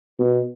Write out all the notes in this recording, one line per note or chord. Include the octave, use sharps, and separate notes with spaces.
B2